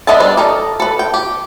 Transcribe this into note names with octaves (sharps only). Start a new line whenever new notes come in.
B3 D4 D#5 E5 A5
G3 D4 B4
A4 A#4 D5 D#5
A4 B4
G5
G4